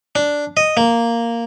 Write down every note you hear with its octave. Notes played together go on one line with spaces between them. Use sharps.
D4
D#5
A#3